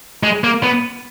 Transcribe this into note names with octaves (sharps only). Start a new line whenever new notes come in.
G#3
A#3
B3